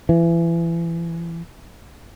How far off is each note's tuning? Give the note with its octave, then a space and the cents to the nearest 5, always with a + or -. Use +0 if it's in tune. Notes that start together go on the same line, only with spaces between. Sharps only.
E3 +30